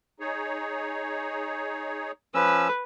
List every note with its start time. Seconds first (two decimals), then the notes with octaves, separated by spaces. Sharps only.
0.20 D#4 G#4 C#5
2.35 F3 C#4 B4 E6